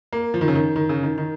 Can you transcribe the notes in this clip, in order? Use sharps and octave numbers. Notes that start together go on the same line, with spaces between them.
A#3
F3
D#3
C#3
D#3
D#3
C#3
D#3
D#3